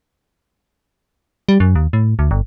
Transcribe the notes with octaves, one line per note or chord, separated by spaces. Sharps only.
G3
F#2
D#2
A2
D2
G1